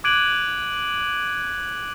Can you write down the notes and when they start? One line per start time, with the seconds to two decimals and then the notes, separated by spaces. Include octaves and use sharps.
0.04 D6 F#6 G#6 D7 D#7 F#7